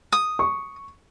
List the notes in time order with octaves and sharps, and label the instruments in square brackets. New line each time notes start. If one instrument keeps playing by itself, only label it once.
[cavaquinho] D#6
[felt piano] C#6